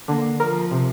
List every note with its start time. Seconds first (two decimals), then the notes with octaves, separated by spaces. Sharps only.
0.08 D3 A#3
0.39 F3 A#4
0.71 C3